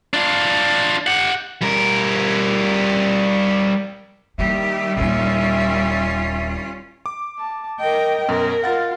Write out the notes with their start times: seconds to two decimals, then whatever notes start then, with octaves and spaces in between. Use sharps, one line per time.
0.14 D4 F4
1.07 G4 F#5
1.62 G3 A#4
4.38 D#3 G3 A#3 E4 G4 E5
4.97 D#1 A#3 C#4 F4
7.06 D6
7.39 A5
7.80 A#4 D#5 G5
8.28 F#2 B2 A#4
8.64 F4 F#5 A6